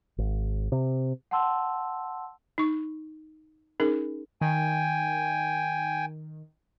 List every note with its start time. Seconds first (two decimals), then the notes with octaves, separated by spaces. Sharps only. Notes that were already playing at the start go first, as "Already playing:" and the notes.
0.18 G#1
0.72 C3
1.31 F#5 G5 A5 C6 E6
2.58 D#4 C#6
3.80 C#4 D#4 G#4 A#4
4.41 D#3 G5 G#5